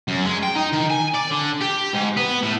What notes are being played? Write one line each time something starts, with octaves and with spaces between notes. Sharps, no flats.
F#2
G#3
G5
D#4
D#3
G#5
D5
D3
G4
G#2
B3
A2